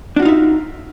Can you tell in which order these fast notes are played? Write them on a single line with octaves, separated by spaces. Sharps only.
D4 F#4 F4 D#4 E5